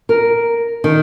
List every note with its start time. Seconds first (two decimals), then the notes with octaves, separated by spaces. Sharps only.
0.09 A#4
0.84 D#3